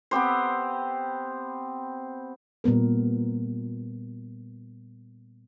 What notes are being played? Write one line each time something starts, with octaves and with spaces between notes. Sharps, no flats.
B3 C4 G4 C5
A#2 G3 B3 A#4